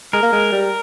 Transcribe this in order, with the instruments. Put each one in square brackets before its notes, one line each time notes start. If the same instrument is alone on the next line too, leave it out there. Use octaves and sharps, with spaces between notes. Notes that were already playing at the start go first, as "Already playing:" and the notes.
[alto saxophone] G#3 [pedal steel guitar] A#4
[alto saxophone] A#3
G#3
G3